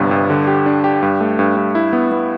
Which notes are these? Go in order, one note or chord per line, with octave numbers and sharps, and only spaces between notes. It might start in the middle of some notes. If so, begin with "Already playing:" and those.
Already playing: G1 G2 C3 B3
G2
D3
G4
D4
G4
G2
A3
G2
G2
E4
B3
B3